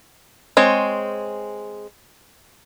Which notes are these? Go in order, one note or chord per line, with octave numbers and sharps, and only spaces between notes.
G#3 C4 C#5